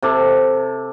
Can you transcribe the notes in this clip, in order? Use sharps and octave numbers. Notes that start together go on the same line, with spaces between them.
C3 A4 D6